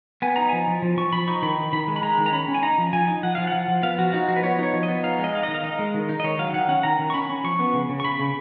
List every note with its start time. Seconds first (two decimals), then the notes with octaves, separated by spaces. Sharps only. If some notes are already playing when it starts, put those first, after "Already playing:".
0.22 B3 G#5
0.36 D#4 A#5
0.49 F3 G#5
0.68 F3
0.82 F3
0.97 F3 C#6
1.13 F3 B5
1.28 D#4 C#6
1.42 D#3 B5
1.58 D#3
1.73 D#3 B5
1.88 G#3
1.96 B5
2.03 G#3 A#5
2.18 D#3
2.26 A#5
2.32 C#4 B5
2.48 C#4
2.55 G#5
2.63 D#4 A#5
2.78 F3
2.93 F3 G#5
3.08 D#4
3.23 F3 F#5
3.35 F3 F5
3.47 F#5
3.53 F3
3.68 F3
3.82 B3 F5
3.98 F3 F#4
4.13 D#4 F#4
4.28 F3 F#4
4.36 B4
4.43 B3 C#5
4.59 D#4 C#5
4.73 F3
4.83 D#5
4.88 B3
5.03 D#4 F5
5.19 G#3
5.24 D#5
5.33 D#4 F5
5.43 D#3 D#5
5.54 F5
5.64 D#4 D#5
5.79 G#3
5.94 D#3
6.09 D#4
6.20 D#5
6.24 D#3 C#5
6.39 F#3 F5
6.53 D#3 F#5
6.69 C#4 F#5
6.83 D#3 A#5
6.99 D#3
7.10 C#6
7.14 C#4 B5
7.30 C#4
7.44 F3 C#6
7.59 B3
7.74 C#3
7.89 C#3
8.00 C#6
8.04 C#3 B5
8.20 C#3